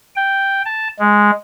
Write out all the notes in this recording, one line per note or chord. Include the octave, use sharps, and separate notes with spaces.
G5
A5
G#3